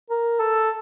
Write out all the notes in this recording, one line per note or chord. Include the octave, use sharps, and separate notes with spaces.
A#4
A4